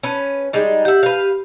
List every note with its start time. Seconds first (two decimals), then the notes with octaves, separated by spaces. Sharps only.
0.03 C#4 B4
0.53 G3 G#3 D#4
0.85 G4 E5 F#5
1.03 B4 F5